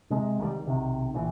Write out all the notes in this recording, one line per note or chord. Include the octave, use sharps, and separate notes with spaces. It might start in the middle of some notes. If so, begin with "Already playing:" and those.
C3 G#3
C2 D#3 F3 G3
B1 C3 D#3
A#1 E3